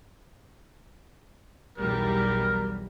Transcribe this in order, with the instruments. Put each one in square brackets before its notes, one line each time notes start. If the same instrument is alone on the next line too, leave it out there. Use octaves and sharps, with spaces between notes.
[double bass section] B1 E2 F#3 [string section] E3 G3 [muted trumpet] A#4